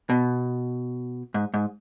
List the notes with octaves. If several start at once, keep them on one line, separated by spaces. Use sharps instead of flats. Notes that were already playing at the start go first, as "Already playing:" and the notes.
B2
G#2
G#2